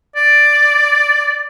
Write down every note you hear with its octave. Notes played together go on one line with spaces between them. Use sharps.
D5